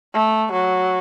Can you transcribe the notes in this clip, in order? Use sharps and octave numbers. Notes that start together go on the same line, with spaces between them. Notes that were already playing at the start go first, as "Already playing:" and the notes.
A3
F#3